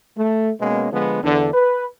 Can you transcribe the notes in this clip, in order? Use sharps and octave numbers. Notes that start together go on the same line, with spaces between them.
A3
B2 G#3 A#3 B3 C#4
D3 F3 G#3 B3
E2 D3
B4